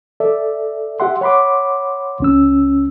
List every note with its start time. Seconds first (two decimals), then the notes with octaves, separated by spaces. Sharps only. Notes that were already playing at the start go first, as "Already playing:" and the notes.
0.20 A4 D5 E5
1.00 G4 E5 F#5 C6
1.21 C#5 F#5 B5 C6 D6
2.20 C#2 C#4 E6